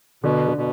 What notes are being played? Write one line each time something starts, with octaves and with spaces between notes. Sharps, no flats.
B2 D3
D3
B2